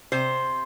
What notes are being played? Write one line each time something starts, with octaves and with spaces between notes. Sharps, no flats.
C3 C5